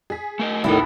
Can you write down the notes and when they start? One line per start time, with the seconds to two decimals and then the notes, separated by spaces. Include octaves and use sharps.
0.10 G#4 B6
0.39 A3 A#4 D#5
0.64 A1 D#2 A2 C3 D#3 B3 D#4 E4